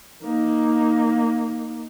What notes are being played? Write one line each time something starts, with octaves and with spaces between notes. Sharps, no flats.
A#3 D#4